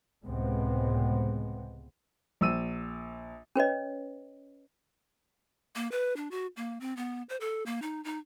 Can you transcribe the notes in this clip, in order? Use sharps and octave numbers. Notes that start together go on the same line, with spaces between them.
C#2 A2 C3 G#3 B3 C4
A#1 E6 D#7
C#4 B4 C#5 D#5
A#3
B4
D4
F#4
A#3
C4
B3
C5
A4
A#3
D#4
D#4